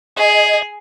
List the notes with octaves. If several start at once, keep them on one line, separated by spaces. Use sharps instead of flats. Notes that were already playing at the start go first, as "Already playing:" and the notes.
G#4 D#5 G#6